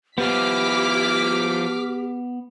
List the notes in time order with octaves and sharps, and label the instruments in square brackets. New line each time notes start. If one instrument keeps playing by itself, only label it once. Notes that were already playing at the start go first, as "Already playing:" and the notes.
[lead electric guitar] F3 E4 [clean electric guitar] B3 [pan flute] G4 [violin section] D6 F6 B6